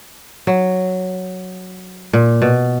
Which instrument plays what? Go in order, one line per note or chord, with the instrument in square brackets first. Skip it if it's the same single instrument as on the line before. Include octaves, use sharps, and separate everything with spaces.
[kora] F#3
A#2
B2